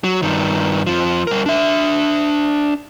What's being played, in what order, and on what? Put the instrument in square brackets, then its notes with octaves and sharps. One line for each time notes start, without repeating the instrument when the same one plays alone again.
[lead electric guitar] F#3
G2 D#3
F2 F3
G3 A#4
D4 E5